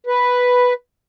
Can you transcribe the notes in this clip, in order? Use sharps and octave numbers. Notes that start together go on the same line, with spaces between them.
B4